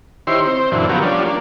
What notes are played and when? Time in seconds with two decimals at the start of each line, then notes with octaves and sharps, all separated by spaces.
0.27 D#3 E4 G4 C5 C#5 C6
0.46 C4 C5
0.72 F#2 A#2 D3 E3
0.89 F3 F#3 B3 C#4 G4 A#4
1.02 F3 G3 C#4 D4
1.26 A#3 D4